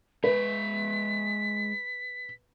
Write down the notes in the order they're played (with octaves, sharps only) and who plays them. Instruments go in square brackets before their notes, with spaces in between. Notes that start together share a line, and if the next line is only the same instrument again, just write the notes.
[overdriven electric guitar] G#3 E5 [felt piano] B4 [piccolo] B6